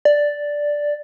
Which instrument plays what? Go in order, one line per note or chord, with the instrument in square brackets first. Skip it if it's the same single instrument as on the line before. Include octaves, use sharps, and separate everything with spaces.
[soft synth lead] D5